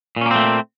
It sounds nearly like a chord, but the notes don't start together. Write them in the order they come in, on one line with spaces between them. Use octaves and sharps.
A#2 C#4 A#3 C4 A3